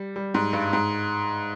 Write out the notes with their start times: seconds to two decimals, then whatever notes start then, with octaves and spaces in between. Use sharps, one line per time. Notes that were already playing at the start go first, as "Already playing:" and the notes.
Already playing: G3
0.16 G3
0.34 G#2
0.53 G2
0.73 G#2